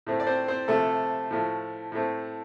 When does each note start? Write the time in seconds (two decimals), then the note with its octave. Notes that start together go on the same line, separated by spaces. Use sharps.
0.07 A2 A3 C4
0.20 D5
0.27 C4 C5
0.48 C4 C5
0.68 C3 F3 A3 C4 A4
1.31 A2 F3 A3
1.92 A2 A3 C4